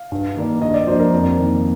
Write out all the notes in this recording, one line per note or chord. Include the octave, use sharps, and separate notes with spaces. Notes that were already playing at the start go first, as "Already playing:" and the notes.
Already playing: F5
G2
D#3 A#3 D4
G2 D#5
D5
F3 A#3 D4 C5
A#4
F2
D#3 A#3 D#4